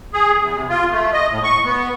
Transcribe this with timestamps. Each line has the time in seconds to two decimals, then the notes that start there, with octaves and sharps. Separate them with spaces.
0.14 G#4
0.41 E2
0.54 C3
0.69 F4
0.92 A3
1.13 D#5
1.30 A2
1.44 C#6
1.65 B3